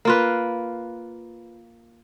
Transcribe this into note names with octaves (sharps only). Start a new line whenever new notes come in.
A#3 F4 B4